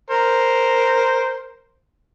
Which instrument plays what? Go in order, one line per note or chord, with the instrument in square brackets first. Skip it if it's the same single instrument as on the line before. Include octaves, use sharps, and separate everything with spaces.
[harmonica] A#4 C5